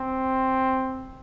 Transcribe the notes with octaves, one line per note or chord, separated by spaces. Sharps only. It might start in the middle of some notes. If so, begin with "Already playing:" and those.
Already playing: C4